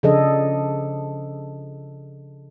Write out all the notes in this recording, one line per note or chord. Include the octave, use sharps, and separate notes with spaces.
C#3 F3 D4 G#4 A4 D#5